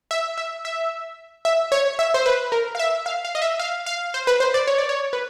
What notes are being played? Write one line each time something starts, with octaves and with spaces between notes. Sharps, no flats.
E5
E5
E5
E5
C#5
E5
C5
B4
A#4
F5
E5
F5
F5
D#5
E5
F5
F5
C5
B4
C5
D5
C#5
D5
C#5
B4